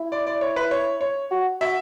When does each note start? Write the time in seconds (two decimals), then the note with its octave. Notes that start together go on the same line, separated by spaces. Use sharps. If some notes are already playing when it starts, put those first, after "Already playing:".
Already playing: E4
0.12 D5
0.27 D5
0.41 C#5
0.56 B4
0.71 C#5
1.01 C#5
1.31 F#4
1.61 F#4 E5